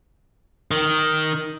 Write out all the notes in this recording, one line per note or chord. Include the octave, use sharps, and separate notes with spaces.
D#3